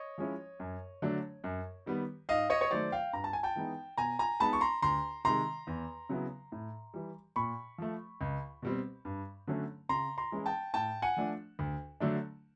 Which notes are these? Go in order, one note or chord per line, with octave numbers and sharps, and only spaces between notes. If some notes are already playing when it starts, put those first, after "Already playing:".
Already playing: C#5 D#5
F3 G#3 C#4 E4
F#2
D3 F#3 A3 D4
F#2
D#3 G3 B3
G#2 D#5 F5
C#5 D#5
C#5
D#3 F#3 A3 C5 D5
F5 G5
G2 A#5
A5
G#5
G5 A5
E3 G#3 B3 D#4
B2 G#5 A#5
G#5 A#5
G#3 B3 D#4 A5 B5
C#6
A#5 C6
D2 A#5 C6
C3 D#3 G#3 A#5 C6
E2
C#3 F#3 B3 E4
A2
E3 G3
A#2 B5 C#6
F3 A3
C#2
B2 G3 C4
G2
D3 F#3 A3 C#4
C#3 A#5 C6
A#5 C6
E3 G#3 C#4 E4
G5 A5
A2 G5 A5
F#5 G#5
F3 A3 D4
D2
D3 F#3 A3 D4